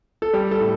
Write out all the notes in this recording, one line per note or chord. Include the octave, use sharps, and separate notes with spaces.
A4
G3 G4
A4
A2